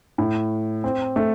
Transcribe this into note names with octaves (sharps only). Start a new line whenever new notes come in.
A2
C4
A3